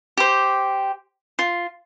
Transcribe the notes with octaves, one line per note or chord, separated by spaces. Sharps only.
G4 C5
F4